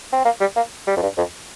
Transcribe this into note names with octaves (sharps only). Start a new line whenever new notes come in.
C4
A#3
G3
A#3
G3
F2
G2
F2